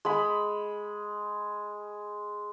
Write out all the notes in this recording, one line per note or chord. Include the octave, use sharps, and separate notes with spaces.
G#3 B5